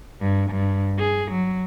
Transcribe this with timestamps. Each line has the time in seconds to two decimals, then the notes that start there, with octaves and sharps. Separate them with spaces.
0.21 G2
0.51 G2
0.99 G#4
1.32 F#3